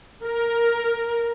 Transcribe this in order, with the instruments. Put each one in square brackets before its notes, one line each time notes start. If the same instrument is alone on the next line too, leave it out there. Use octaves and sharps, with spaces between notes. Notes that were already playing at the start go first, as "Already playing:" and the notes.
[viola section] A#4